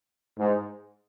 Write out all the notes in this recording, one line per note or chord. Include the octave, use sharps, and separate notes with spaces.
G#2